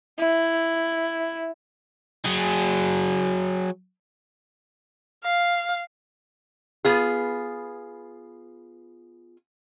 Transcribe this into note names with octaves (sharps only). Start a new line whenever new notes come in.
E4
F#3 G#4
F5
B3 F4 G#4